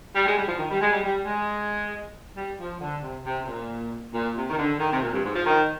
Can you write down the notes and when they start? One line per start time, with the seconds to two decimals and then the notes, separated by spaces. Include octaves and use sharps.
0.15 G3
0.26 G#3
0.37 G3
0.48 F3
0.59 D#3
0.70 G3
0.81 G#3
0.93 G3
1.03 G3
1.25 G#3
2.37 G3
2.58 F3
2.81 D3
3.02 C3
3.26 C3
3.43 C3
3.47 A#2
4.14 A#2
4.36 C3
4.49 D#3
4.59 D3
4.80 D#3
4.92 C3
5.02 A#2
5.10 F2
5.13 G2
5.25 G#2
5.35 F3
5.46 D#3